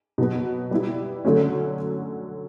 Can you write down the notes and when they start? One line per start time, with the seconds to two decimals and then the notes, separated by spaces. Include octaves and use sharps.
0.18 B2 F#3 B3
0.71 G3 B3 E4
1.25 D3 F#3 A3 C#4